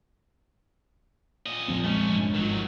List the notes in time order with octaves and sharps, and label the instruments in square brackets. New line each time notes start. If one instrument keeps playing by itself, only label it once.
[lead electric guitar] A#2 D#5
[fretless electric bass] A#1 F3 C4 [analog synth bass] F2
[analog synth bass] G#3 [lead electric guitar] A3 C#4
[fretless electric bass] F1 G2
[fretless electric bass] G#1 F3 [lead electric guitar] D#3 F#3